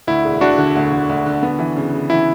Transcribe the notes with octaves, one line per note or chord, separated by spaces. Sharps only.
D2 E4
E1
D3 D4 F#4
D3
D2
D2
D2
D3
B3
E3
C#3
C#3
E3 E4